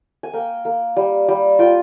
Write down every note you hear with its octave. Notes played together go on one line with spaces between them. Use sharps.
G#5
A#3 G5
A#3
G3
G3
F4 G5